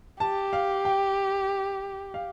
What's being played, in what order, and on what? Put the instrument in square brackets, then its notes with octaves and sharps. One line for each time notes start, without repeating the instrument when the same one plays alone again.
[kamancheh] G4 [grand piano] A5
[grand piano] F5
G5
F5